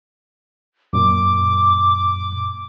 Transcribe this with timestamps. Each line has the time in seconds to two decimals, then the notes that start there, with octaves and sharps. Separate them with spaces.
0.93 F#2 A#2 D6